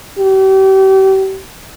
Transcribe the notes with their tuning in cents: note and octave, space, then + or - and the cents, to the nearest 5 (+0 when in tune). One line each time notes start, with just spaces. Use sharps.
G4 -35